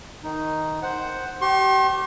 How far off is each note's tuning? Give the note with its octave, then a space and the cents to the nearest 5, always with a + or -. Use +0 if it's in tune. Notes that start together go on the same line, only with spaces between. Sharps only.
D#3 +0 D#4 +0
C5 +0 F#5 +5
G4 -35 C6 +40